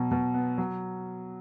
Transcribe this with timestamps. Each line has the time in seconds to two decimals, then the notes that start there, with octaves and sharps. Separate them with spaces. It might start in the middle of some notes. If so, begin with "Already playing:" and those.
Already playing: B2 F#3
0.11 B2
0.34 B3
0.58 F#3